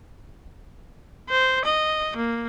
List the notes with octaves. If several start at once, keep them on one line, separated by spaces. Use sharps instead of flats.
C5
D#5
A#3